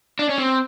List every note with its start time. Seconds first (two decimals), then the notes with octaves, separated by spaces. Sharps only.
0.19 D4
0.29 C#4
0.38 C4